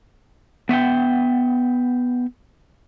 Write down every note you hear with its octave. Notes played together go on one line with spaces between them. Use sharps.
B3 E5 F#5 G5